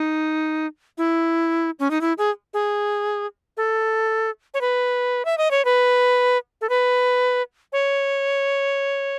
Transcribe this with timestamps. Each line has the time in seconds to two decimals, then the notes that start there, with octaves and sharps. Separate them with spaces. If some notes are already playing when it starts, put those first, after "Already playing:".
Already playing: D#4
0.98 E4
1.80 C#4
1.91 D#4
2.01 E4
2.18 G#4
2.54 G#4
3.57 A4
4.54 C#5
4.61 B4
5.25 E5
5.38 D#5
5.51 C#5
5.65 B4
6.61 A4
6.69 B4
7.73 C#5